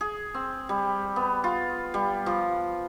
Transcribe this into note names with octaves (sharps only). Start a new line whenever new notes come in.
G#4
C4
G3
B3
F4
G3
F3